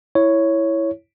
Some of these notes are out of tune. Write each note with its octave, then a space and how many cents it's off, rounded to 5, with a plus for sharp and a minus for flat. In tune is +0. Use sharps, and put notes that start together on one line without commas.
E4 +0 C#5 +0